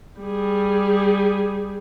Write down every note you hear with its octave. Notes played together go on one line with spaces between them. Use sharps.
G3 G#4